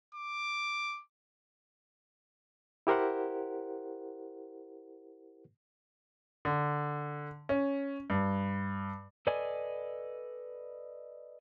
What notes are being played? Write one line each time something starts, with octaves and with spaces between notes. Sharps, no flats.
D6
E4 G4 A#4 C5 F#5
D3
C#4
G2
A4 B4 D5 D#5 G#5